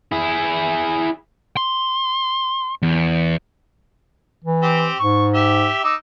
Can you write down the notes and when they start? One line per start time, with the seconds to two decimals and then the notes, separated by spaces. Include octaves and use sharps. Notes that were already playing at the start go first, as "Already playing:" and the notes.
0.12 E4 G#4
1.57 C6
2.82 E2
4.44 E3
4.63 C4 G4
4.99 G#2 C#6
5.35 G4 E5
5.84 D#4 D6 E6